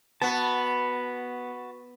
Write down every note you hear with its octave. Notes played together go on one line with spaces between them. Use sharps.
B3 F#4 A5